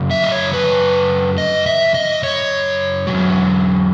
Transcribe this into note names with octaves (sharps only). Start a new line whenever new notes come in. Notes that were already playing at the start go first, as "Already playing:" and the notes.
Already playing: F#2 C#3
E5
D#5
C#5
B4
D#5
E5
D#5
C#5
B2 F#3
E2